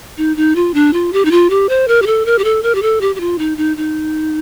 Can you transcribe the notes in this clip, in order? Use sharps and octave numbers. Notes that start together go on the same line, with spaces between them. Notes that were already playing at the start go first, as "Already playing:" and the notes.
D#4
D#4
F4
D4
F4
G4
D#4
F4
G4
C5
A#4
G4
A4
A#4
G4
A4
A#4
G4
A4
G4
G4
F4
D#4
D#4
D#4